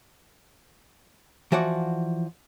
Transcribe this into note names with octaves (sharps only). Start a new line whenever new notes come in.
E3 F3 F#4 D5 F#5